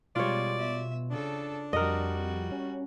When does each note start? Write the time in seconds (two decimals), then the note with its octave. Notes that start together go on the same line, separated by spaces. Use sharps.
0.16 B2 G3 G#3 F4 C#5 D5
0.59 E5
1.11 C#3 D4 A4
1.73 F2 G3 F#4 A#4 D#5
2.52 C#4